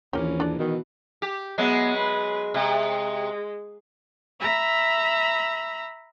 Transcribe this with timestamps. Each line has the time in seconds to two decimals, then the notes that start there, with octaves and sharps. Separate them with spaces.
0.13 A#1 D#2 E3 A#3 C#4 G4
0.40 D4 A4 D5
0.59 B2 D#3 E3
1.22 G4
1.58 F#3 G#3 B3
1.96 B4
2.54 C3 G#3
4.39 E5 A#5 B5 E6